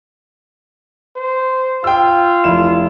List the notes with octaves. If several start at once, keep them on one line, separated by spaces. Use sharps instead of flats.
C5
F4 G5 E6
F1 E4 E7